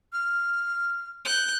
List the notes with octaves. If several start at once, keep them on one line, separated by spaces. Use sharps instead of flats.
F6
F#6 G6